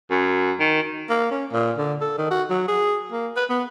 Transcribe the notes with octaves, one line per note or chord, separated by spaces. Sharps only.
F#2
D#3
A#3
C#4
A#2
D3
A4
D#3
F#4
F#3
G#4
A#3
B4
B3